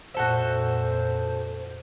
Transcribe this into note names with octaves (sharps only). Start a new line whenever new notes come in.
F2 A#2 F#4 A4 C5 E5